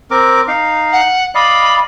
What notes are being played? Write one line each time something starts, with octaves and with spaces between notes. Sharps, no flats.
C4 A#4 D6
D#4 F5
F#5
D5 D#5 F5 B5